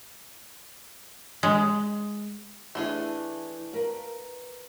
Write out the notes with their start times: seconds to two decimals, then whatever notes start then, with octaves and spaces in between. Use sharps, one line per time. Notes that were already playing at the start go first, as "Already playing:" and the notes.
1.43 G#3
2.75 E3 A3 D4 G#4
3.73 A#4 B4 F5